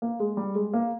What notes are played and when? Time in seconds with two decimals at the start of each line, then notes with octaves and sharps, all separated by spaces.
0.02 A#3
0.20 G#3
0.37 G3
0.55 G#3
0.74 A#3